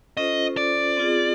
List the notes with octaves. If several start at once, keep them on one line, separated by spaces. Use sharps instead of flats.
C#4 F4 A4 C5 D#5
D5
C4 F4 G#4